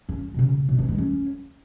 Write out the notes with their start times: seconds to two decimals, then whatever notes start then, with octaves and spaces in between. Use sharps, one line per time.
0.09 C#4
0.34 B2
0.39 C#3
0.69 B2
0.79 E3
0.89 G#3
0.98 C#4